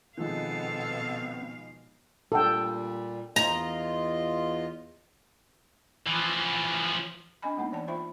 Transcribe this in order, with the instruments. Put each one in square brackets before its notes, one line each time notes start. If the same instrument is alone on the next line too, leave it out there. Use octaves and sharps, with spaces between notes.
[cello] B2 F5 [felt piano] D#3 F3 G#3 [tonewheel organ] B3 C4 [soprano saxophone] A4
[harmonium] A#2 G3 [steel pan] A4 F5 G5
[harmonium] E2 F4 D#5 [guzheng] A#5
[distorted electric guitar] E3 F3
[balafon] C4 D4 D#5 G#5 B5
G#3 A#3 B3 D#4
E3 D5 G5 A5
F4 C5 E5 G5 B5